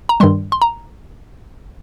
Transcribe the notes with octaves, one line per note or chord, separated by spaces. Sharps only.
A#5
G2 D#3 G3 C6
C6
A#5